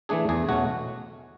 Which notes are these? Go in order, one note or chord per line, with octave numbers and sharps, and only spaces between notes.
E3 A3 D4 G#4
E2 G#4
B2 A3 C#4 F#4